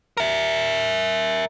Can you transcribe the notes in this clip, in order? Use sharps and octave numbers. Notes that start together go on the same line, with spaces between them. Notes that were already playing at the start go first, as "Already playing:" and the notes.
A#4 E5